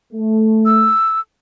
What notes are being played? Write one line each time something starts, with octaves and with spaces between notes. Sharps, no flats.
A3
E6